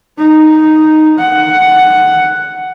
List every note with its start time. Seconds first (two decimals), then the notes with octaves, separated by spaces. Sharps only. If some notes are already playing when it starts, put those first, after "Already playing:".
0.18 D#4
1.18 F#5